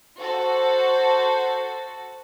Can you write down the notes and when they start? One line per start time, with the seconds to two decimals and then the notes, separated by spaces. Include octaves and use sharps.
0.19 F#4 A4 C5